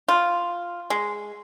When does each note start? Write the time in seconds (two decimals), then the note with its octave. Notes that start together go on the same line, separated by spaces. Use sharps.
0.08 F4
0.90 G#3